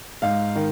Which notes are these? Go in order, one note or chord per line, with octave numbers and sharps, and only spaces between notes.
G#2 F5
D#3